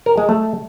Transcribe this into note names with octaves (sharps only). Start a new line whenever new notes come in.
A#4
G#3
A3